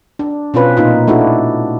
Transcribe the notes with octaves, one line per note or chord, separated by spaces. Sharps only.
D4
B2 C4 C#4 F4 B4
A#2 D#4 F4
A3 D4 E4 F#4